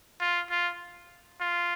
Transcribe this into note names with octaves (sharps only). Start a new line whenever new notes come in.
F4
F4
F4